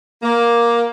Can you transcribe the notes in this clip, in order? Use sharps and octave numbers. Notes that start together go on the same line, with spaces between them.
A#3